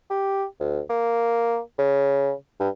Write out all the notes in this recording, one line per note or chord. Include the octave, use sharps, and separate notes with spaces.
G4
D2
A#3
C#3
G2